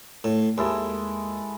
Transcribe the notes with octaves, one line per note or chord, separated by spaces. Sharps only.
A2
D#2 G#3 E4 A4